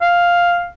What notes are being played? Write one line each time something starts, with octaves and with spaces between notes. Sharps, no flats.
F5